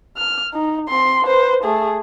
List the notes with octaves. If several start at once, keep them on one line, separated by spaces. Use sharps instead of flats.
F6
D#4
C4 C6
B4 C5
A3 G#4